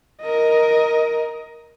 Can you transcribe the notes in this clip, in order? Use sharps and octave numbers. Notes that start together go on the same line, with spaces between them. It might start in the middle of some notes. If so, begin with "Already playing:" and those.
A#4 D#5